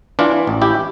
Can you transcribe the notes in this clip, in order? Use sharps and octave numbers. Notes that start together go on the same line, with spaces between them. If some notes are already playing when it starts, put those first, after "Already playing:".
E3 D4 F4
A1
E4 G4